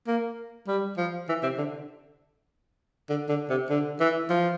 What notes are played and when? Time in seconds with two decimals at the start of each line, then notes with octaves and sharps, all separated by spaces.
0.08 A#3
0.68 G3
0.97 F3
1.29 E3
1.43 C3
1.58 D3
3.09 D3
3.29 D3
3.50 C3
3.70 D3
4.00 E3
4.30 F3